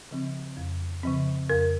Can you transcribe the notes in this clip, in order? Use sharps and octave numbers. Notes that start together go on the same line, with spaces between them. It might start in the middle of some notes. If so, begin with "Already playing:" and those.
C#3 F3 C4
F2
C#3 F3 C4
F2 A#4